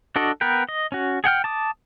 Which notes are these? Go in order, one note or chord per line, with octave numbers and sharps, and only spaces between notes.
D4 F#4 A4 D5 D#5
B3 A#4 B4 G5
D#5
C#4 F#4
G#4 F#5 G5 F6
A5 D6 D#6